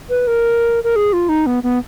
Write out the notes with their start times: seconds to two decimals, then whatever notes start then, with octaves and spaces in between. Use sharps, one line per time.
0.10 B4
0.27 A#4
0.84 A#4
0.96 G#4
1.13 F4
1.29 D#4
1.46 B3
1.63 B3